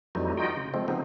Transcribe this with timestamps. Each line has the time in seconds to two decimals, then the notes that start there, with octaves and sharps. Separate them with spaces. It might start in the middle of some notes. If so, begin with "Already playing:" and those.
0.15 F2 E3 F#3 G3 A3 D#4
0.37 D#4 F4 F#4 D#5 G5
0.56 C#3
0.74 F3 G#3 A3 C4
0.88 C#3 F3 B3 C4 D#4